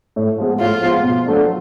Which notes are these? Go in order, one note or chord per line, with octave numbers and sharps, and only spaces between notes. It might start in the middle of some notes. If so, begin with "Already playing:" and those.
A2
F3 G#3 B3
A2 F4
F3 G#3 B3
B2
F#3 A3 D4 F4